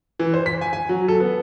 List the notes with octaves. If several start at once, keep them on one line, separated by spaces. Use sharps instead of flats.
E3
C5
B6
G#5
G#5
F#3
A4
B3